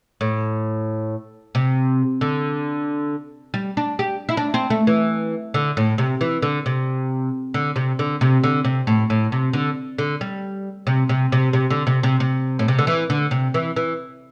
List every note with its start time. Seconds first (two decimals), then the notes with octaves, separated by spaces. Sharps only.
0.21 A2
1.55 C3
2.21 D3
3.54 G3
3.77 D4
3.99 G4
4.29 E4
4.37 D4
4.54 C4
4.70 A3
4.87 E3
5.54 D3
5.77 A2
5.98 C3
6.21 E3
6.42 D3
6.66 C3
7.54 D3
7.76 C3
7.99 D3
8.21 C3
8.43 D3
8.65 C3
8.87 A2
9.10 A2
9.32 C3
9.53 D3
9.98 D3
10.21 G3
10.87 C3
11.09 C3
11.32 C3
11.53 C3
11.70 D3
11.87 C3
12.03 C3
12.20 C3
12.59 A2
12.68 C3
12.79 D3
12.87 E3
13.10 D3
13.31 C3
13.54 E3
13.76 E3